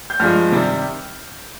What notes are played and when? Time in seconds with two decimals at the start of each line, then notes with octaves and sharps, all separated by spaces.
0.10 G6
0.20 G2 F3 G#3 F6
0.52 C3 D#3 G3